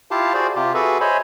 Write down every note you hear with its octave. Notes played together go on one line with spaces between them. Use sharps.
E4 F4 G4 F5 A5
F#4 G#4 C5 D5
C3 F4 G4
F#4 G#4 A4 B4 E5
C5 C#5 D#5 G#5 B5